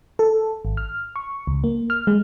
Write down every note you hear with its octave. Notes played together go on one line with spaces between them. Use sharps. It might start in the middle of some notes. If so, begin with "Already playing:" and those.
A4
G#1
F6
C#6
C#2
A#3
F6
G#3